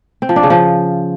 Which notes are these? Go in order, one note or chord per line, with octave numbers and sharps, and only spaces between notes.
C4
F3
D4
C#3
F3